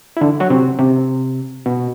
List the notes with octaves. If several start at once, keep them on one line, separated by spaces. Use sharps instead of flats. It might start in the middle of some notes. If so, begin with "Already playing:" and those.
E4
D3 D4
F#3 F#4
C3 C4
C3 C4
B2 B3